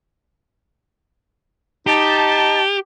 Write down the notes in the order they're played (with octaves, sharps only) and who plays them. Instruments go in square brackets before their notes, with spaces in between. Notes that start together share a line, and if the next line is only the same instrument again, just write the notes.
[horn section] D#4 A5 [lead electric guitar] G4